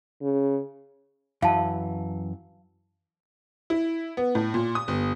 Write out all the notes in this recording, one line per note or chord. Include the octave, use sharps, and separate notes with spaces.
C#3
F#2 E3 F5 A5
E4
B3
A2
A#2
D#6
G1